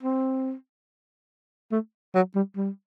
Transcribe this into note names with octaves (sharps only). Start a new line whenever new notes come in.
C4
A3
F#3
G3
G3